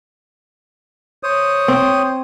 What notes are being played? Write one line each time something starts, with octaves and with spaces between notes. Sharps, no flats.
C5 C#5 D#6
C4